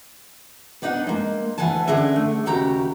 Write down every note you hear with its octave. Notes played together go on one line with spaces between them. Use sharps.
B3 D4 D#4 F5 F#5
G#3 A#3
D2 G#2 E3 F#5 G#5 A5
D3 C#4 D4 G#4 D#5 E5
A3
D#2 C#3 F#4 G4 A#5